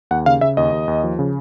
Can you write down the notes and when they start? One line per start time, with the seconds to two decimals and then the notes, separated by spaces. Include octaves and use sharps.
0.11 D#2 F#5
0.26 C#3 F5
0.41 C#3 E5
0.57 D#2 D#5
0.72 D#2
0.88 D#2
1.04 F3
1.19 C#3